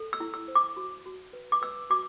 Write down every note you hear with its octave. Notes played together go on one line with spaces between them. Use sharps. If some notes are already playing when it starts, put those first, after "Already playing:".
Already playing: A4
E6
E4
E6
C5
D6
F#4
F#4
B4
D6
B4 E6
F#4 D6